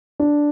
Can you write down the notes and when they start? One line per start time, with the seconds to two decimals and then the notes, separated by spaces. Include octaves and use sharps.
0.20 D4